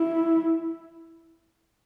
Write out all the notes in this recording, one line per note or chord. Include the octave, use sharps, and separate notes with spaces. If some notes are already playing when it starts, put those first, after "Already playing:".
Already playing: E4